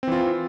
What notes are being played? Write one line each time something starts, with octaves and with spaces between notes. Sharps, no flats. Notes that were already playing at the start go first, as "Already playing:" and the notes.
E3 C4 F4